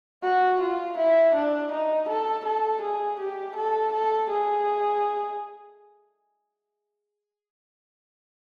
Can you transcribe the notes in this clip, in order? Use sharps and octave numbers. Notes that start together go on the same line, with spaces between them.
F#4
F4
E4
D4
D#4
A4
A4
G#4
G4
A4
A4
G#4